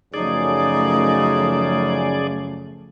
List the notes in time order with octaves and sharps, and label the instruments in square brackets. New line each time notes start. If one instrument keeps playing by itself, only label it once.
[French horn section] F#2 C#3 [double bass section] F3 A3 [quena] D#4 [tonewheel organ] G#4 D5